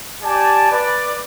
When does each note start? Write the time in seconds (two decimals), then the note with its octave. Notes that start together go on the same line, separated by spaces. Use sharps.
0.23 G4 D5 G#5 A5
0.70 B4 D5